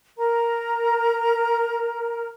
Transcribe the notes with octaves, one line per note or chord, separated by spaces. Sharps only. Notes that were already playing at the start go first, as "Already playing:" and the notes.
A#4 A#5